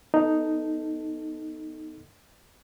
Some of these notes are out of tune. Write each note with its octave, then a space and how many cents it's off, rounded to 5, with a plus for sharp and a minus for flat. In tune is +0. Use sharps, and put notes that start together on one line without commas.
B3 +0 D#4 +0 A4 +5